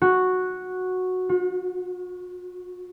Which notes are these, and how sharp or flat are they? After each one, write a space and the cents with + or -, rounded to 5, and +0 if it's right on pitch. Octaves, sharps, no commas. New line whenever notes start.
F#4 -5
F#4 -45